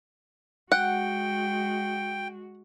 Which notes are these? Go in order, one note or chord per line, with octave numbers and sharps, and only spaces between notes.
G#3 F#4 F#5 G5